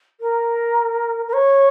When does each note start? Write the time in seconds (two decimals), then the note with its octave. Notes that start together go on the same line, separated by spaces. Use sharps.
0.21 A#4
1.28 A#4
1.33 C#5